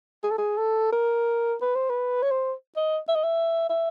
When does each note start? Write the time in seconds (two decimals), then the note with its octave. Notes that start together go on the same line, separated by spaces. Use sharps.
0.23 G#4
0.31 A4
0.38 G#4
0.57 A4
0.92 A#4
1.62 B4
1.75 C5
1.89 B4
2.23 C#5
2.31 C5
2.77 D#5
3.08 E5
3.15 D#5
3.24 E5
3.69 E5